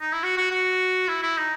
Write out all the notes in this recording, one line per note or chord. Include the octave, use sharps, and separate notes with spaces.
D#4
E4
F#4
F#4
F#4
E4
E4
D#4